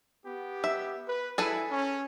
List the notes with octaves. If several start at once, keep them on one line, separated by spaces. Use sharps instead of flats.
B3 G4
E5
B4
E4 G#4 A4 B4
C#4